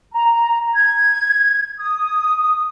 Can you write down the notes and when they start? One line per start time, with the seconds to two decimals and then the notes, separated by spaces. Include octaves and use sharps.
0.12 A#5
0.74 G#6
1.79 D#6